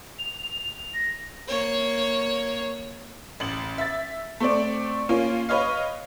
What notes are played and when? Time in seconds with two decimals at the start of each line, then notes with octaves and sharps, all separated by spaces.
0.19 F7
0.94 A#6
1.48 A#3 C#5
3.40 A1 F#7
3.78 E5 A6
4.40 A3 C4 D5
5.09 A#3 C#4 F4
5.49 B4 C#5 D#5 F5